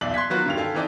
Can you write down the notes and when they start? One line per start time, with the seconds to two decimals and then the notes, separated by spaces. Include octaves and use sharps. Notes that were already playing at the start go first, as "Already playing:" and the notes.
0.01 D#1 B1 E2 D5 E5 F#7
0.14 C6 F#6 G#6 B6
0.30 D#3 F#3 B3 F4 F#4 B4
0.46 G2 D3 D#3 G4 F5 F7
0.57 A4 F5 G5 G#5
0.74 D#3 E3 C4 D#4 A4 D5